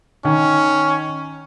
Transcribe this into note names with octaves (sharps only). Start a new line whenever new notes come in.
D#3 C#4